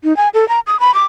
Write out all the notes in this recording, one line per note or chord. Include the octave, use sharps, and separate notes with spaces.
D#4
G#5
A4
A#5
D#6
B5
D6